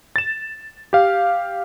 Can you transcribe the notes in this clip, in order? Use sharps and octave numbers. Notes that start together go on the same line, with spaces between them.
A6 E7
G4 F5